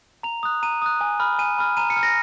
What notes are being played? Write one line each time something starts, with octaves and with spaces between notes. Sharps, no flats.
A#5 F7
D#6 F#6
A#5 D#7
D#6 F#6
G#5
B5 F6
G#5 D#7
B5 F6
A#5 D#7
C#7
F6
A#6